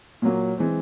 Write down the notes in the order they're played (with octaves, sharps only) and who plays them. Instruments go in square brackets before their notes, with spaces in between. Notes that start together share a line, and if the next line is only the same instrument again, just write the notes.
[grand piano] A#2 F#3 A#3
E3 G#3 C4